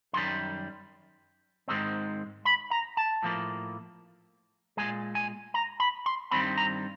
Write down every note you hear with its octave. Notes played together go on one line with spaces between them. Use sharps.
F#2 D#3 G3 C6
G#2 D#3 G#3 C4
B5
A#5
A5
A2 F3 A#3
A#2 F3 G#3 G#5
G#5
A#5
B5
C6
G2 D#3 G3 C4 B5
A#5